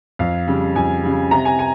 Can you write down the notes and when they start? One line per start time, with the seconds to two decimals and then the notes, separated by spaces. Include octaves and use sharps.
0.19 F2 F5
0.47 C#3 G3
0.75 F2 G#5
1.03 C#3 G3
1.31 C3 A#5
1.45 G#5
1.59 G#5